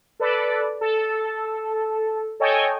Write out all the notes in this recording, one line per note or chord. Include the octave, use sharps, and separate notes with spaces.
A4 B4 D5
A4
A4 C#5 D#5 G5 G#5